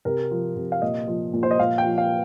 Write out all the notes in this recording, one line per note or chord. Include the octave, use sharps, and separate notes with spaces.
C3 A#4
F3
C3
F5
A#2 D#5
F3
A#2
C5
D#5
A#2 F5
G5
F3
F5